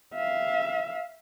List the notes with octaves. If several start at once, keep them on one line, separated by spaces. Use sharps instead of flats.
E5 F5